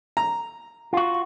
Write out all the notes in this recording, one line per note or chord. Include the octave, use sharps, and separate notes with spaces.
A#5
F4 F#4